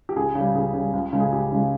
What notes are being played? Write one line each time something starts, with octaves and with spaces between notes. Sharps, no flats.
G4
C#2 G#4
C#3 G3
C#2 G#4
C#3 G3
C#2
C#3 G#3
G#4
C#2 G4
C#3 G#3